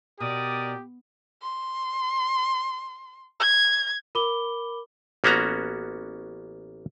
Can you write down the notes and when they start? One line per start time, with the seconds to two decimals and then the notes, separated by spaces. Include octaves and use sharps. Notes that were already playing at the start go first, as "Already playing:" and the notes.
0.20 B2 G4 A#4 D5 D#6
1.42 C6
3.40 G#6
4.15 A#4 B5 D6 G7
5.24 A1 A#3 B3 C#4 F#4 A#5